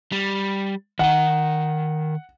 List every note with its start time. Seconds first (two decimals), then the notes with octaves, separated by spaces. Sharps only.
0.12 G3
0.99 D#3 D#5 F#5